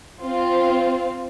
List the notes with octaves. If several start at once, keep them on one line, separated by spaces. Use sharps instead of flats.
C4 F4